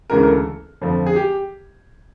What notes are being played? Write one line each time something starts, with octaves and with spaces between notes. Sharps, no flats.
D2 C#3 E3 G#3 A#4
A#4
A4
F2 D3 F3 A3
G#4
G4